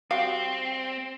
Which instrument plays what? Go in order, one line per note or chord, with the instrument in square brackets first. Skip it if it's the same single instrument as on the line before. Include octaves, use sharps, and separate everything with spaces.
[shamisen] G3 F#4 F5 [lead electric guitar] C4